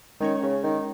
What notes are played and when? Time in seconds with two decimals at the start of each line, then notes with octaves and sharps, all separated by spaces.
0.20 D#3 G#3 C#4 A#4 C#5
0.43 C#3
0.64 D#3